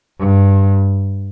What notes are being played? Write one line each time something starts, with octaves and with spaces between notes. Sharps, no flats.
G2